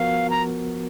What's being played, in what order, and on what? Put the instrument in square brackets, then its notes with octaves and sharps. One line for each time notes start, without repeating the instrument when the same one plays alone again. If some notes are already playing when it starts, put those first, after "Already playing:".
Already playing: [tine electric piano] F3 B3 F#4 A#4 [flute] F5
[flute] A#5